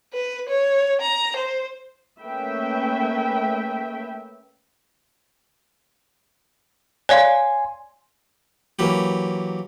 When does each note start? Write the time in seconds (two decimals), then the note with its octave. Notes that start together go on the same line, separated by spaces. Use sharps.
0.13 B4
0.49 C#5
1.01 A#5
1.36 C5
2.21 A3 A#3 C#4 B4 E5 G5
7.09 C#5 D5 F5 G#5 C6
8.79 E3 F#3 A#3 G4